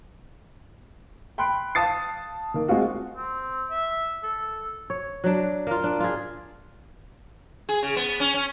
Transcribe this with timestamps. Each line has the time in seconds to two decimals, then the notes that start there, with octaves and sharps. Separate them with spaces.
1.38 G5 B5 C6 F#6 D7
1.75 F5 A5 D#6 A6 C7
2.54 D#3 A#3
2.68 G#3 C4 F4 F#4
3.16 C4
3.71 E5
4.23 A4
4.90 C#5
5.24 F#3 D4
5.67 A#3 F4
5.84 D4
6.00 F4 G#4
7.69 G#4
7.83 C#3
7.96 B3
8.20 C#4
8.34 C#4